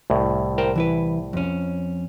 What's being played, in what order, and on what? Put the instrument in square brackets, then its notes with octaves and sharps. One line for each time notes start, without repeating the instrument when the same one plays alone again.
[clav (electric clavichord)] C2 A2
[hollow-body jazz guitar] A#4 C5 G5
E3 E4 B4
F2 C#4